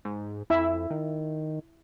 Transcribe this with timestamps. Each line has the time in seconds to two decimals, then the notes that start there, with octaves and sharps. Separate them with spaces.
0.05 G#2
0.50 F2 E4 E5
0.90 D#3